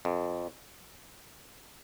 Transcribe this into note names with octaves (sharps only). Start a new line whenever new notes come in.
F2